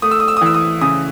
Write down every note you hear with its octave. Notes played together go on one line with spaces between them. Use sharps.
A3 D#6
E6
D#6
E6
D#6
E3 E6
D#6
C#3 D#6